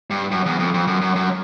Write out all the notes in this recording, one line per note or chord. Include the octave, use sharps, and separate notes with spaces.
G2
F#2
E2
F2
F2
F#2
F#2
F#2